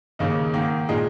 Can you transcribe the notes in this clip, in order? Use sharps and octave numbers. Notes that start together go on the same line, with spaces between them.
D#2 C#3 A#3 D#4
G#2 D#3 A#3
A#2 G#3 D#4 G#4